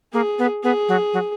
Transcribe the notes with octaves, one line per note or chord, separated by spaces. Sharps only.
A#3 G#4
B3
B3 G#4
F#3
F#3